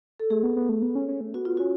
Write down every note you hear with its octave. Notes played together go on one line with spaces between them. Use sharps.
A4
A3 G#4
B3
B3
A3
B3
C#4
C#4
A3
B3 F#4
F4
C#4 F#4